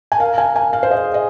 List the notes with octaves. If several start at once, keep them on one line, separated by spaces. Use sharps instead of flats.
G#5
A#4 F5
G#5
G#5
F5
C5
G#4 D#5
D#5